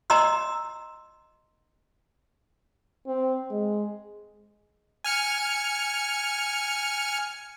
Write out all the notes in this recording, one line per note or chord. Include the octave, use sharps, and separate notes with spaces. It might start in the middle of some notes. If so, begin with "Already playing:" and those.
D#5 A#5 C6 E6
C4
G#3
G#5 F6 C#7